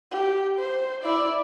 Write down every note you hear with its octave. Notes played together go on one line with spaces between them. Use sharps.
G4
C5
E4 D5